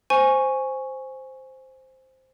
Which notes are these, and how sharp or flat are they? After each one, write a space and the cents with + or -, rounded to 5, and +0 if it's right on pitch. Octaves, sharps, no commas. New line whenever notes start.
C5 +0 G#5 +0 C#6 +0